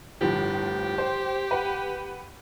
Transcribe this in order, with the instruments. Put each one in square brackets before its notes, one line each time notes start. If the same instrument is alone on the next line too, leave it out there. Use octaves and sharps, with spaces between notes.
[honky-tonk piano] G1 A2 F3 [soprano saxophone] G4
[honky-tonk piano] C5
B4 F#5